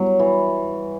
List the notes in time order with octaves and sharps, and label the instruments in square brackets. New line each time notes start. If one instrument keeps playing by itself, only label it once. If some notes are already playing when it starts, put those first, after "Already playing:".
Already playing: [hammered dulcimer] F#3 [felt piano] G3 B3 E4
[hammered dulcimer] E3